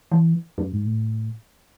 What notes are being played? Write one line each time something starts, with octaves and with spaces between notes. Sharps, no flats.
E3
F#2
G#2
A2